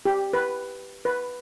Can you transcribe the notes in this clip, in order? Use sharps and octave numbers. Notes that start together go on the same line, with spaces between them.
G4
B4
B4